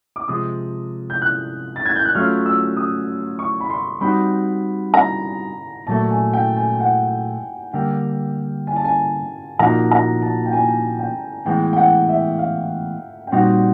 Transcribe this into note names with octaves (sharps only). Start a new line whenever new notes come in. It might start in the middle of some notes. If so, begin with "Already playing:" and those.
D6
C3 F3 G#3 D#6
G6
F#6
A6
G#6
G6
F#6
F#3 A3 C#4 F4 F6
E6
D#6
C#6
B5
C6
G3 C4 D#4 F#4 B5
A#5
A#2 F#3 A3 A5
G#5
G5
G#5
F#5
D3 G3 A#3 G5
G#5
A5
G#5
A#2 F3 A#3 D#4 F#4 A#5
A#5
A5
G5
G#5
G5
A2 E3 G#3 B3 G5
G5
F#5
E5
F5
G5
A#2 G3 C4 D#4 F#4 F#5